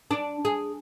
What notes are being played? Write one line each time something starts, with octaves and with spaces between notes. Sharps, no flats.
D4
G#4